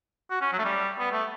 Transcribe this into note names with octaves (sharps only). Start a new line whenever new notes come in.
F#4
C#4
F#3
A3
G3
B3
A3